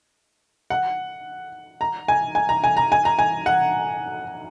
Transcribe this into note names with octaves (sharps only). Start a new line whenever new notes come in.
F#5
A#5
G#5
G#5
A#5
G#5
A#5
G#5
A#5
G#5
F#5